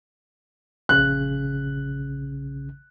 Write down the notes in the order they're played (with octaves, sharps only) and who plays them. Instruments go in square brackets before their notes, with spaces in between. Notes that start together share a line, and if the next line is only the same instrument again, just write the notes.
[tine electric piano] A#1 C#3 [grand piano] F#6